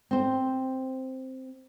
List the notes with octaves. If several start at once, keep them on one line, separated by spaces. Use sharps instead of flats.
C4 C5